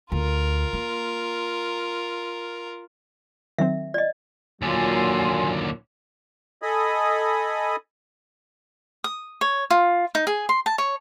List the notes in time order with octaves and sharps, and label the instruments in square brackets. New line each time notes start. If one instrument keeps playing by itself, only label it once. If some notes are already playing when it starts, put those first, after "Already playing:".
[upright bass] D2 [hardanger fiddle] F4 A#4
[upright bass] A#3
[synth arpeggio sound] D#3 F#3 C4 [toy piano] E5
[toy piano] D5 D#5
[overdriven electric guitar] D#2 D3 [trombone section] A#2 F#3 [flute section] F4 G#5 C6
[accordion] A4 D#5 G#5 B5 D#6
[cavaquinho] D#6
C#5
F4
D#4
G#4
C6
A5
C#5